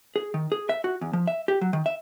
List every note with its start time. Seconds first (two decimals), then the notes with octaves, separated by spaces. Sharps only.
0.16 G#4
0.34 D#3
0.52 G#4
0.69 E5
0.84 F#4
1.01 E2
1.13 F3
1.27 E5
1.48 G4
1.61 F#3
1.73 D#3
1.86 E5